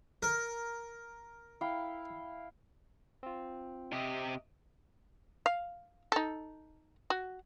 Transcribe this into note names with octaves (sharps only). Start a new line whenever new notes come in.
A#4
E4 F5 G5
C4 F4
C3 G4 D#5 E5 D#6
F5
D#4 A4
F#4